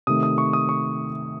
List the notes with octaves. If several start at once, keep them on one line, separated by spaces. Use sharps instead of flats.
C3 D#3 A3 D#6
D#6
C#6
D#6
C#6